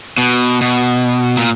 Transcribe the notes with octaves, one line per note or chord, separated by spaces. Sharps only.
B2
B2
A#2